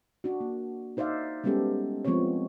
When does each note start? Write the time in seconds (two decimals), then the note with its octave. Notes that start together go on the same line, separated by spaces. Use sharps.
0.24 D4 F#4
0.40 A#3
0.97 D#4 C5 D5 E5 F5
1.44 G3 G#3 B3 C#4 G4 A4
2.05 F3 G#3 B3 C4 C#5